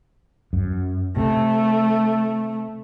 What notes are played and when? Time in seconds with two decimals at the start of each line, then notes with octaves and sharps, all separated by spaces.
0.53 F#2
1.17 C3 A3